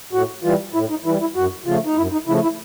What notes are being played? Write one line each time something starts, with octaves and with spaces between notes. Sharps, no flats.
A2 F#4
E3 G3 F4
A2 E4
D#4
E3 G3 E4
E4
F#2 F#4
C#3 F3 A3 F4
D#4
F#2 E4
D#4
C#3 F3 A3 E4
E4